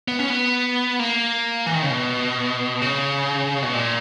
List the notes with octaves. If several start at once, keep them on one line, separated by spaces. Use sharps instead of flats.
B3
C#4
B3
A#3
E3
D#3
C#3
B2
C#3
B2
A#2